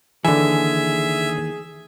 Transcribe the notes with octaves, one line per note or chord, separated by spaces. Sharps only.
D#2 D3 E3 G#4 E5 G#5